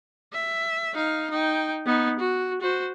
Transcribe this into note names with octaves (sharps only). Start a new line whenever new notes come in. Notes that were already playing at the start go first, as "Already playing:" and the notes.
E5
D#4 F5
D#4 G5
B3 D#4
F#4
F#4 C5